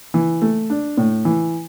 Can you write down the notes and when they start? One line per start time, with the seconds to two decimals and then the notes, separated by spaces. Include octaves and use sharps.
0.14 E3
0.42 A3
0.70 D4
0.97 A2
1.25 E3